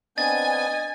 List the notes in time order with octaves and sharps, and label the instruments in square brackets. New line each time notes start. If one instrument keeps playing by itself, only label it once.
[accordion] B3 C4 D4 [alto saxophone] D#5 [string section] G#5 [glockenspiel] A6